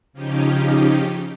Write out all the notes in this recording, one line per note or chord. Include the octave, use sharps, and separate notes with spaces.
C#3 F3 C#4 D#4 G4